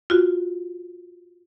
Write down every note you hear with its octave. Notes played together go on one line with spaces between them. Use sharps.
F4 F#4